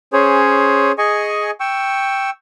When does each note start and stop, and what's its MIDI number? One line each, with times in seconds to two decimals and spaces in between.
0.13 0.92 61
0.13 0.92 68
0.13 0.92 72
0.13 0.92 73
0.98 1.51 68
0.98 1.51 75
0.98 1.51 80
0.98 1.51 85
1.60 2.30 79
1.60 2.30 85
1.60 2.30 88